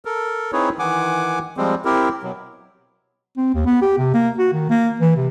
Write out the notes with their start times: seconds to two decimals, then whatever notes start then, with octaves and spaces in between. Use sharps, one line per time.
0.05 A4 A#4
0.53 C4 D#4 E4 G#4 B4 C#5
0.79 D#3 E3 F#5 G#5 D6
1.57 F3 G3 G#3 C4
1.85 C4 E4 G4 A#4
2.23 B2 F#3
3.37 C4
3.54 D#2
3.66 B3
3.82 G4
3.98 C3
4.14 A#3
4.38 F#4
4.53 D#3
4.70 A#3
5.00 E3
5.16 C3